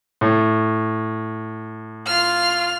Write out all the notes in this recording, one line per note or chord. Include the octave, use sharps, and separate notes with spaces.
A2
F4 F6